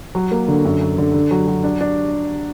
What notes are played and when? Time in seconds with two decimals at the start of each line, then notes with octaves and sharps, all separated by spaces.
0.15 F#3
0.31 A#3
0.48 D3
0.65 F#2
0.81 F#2
0.98 D3
1.14 D3
1.31 F#3
1.48 F#3
1.64 D4
1.81 D4